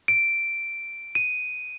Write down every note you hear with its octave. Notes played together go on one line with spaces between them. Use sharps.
D7
D#7